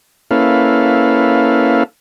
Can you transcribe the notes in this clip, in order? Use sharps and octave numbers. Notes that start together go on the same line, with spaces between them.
A#3 C#4 E4 A4 B4 F5